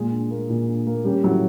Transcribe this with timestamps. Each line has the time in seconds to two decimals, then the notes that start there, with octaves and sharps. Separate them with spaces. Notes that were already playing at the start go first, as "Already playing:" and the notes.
Already playing: A#2 G#3 G#4
0.12 D4
0.31 A#3
0.49 A#2
0.68 D4
0.87 A#3
1.04 G3 C#4 G4
1.23 A2 F#3 F#4